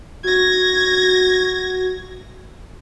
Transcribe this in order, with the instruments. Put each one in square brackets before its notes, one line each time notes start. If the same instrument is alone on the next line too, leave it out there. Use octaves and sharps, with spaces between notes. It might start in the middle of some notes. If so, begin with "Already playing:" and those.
[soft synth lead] F#4 [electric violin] G#6 A#6